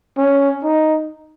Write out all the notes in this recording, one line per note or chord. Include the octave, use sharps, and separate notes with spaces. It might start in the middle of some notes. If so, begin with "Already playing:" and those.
C#4
D#4